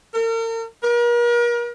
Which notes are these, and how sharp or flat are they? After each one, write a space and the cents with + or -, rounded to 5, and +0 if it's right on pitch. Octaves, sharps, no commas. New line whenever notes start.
A#4 -40
A#4 +40